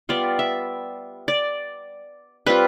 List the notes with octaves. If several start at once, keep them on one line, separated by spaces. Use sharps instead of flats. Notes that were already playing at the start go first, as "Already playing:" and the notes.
G3 B3 F4 D5
E5
D5
G3 C4 F4 B4